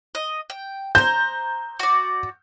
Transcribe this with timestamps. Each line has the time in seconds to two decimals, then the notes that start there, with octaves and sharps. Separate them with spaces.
0.15 D#5
0.50 G5
0.95 C5 A#5 G6
1.80 F#4 D5